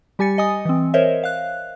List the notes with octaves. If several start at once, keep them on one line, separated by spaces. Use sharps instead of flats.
G3 G4 G#5 A6 C#7
D#5 G#5 D#6
E3 C4
A#4 C5 C#5 D#5 E5
F5 F#6